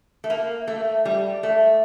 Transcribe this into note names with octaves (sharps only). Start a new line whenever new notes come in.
A3
A#3
A3
G3
A3